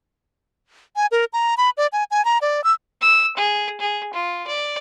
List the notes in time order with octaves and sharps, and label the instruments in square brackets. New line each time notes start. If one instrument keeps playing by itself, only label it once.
[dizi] G#5
A#4
A#5
B5
D5
G#5
G#5
A#5
D5
E6
[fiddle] E6
G#4
G#4
F4
D5